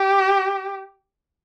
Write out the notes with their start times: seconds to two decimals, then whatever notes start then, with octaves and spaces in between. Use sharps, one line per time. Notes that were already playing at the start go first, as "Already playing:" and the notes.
Already playing: G4